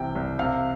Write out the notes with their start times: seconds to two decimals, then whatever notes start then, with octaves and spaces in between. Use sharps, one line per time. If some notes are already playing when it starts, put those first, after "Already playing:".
Already playing: C2 C3 E3 G5
0.15 C2
0.39 C3 F5